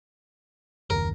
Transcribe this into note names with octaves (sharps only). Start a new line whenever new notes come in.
F#1 D#2 A#4